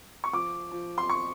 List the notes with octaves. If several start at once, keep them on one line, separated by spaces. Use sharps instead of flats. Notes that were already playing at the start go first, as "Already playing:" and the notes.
C#6
F3 D6
F3
C6
C#6